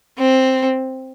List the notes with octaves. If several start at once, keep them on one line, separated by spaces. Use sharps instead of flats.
C4